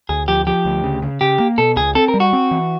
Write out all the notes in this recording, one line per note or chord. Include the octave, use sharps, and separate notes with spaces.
D2 G#4
F3 G4
F3 G4
D2
C#3
C#3
C#3 G4
A#3
B2 A4
C#2 G#4
C4 A4
A#4
G3
F#4
C4
E3